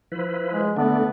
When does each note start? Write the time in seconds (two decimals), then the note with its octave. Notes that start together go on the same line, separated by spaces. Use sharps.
0.12 F3 E4 B4
0.52 G#3
0.77 D3 A3 B3 D4